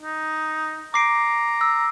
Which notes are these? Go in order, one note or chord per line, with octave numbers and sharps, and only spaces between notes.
D#4
A#5 D6 C7 D7
E6